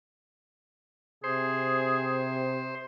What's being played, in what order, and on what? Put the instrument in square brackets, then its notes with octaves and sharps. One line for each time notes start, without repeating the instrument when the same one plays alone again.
[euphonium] C3 [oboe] G#4 [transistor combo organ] C5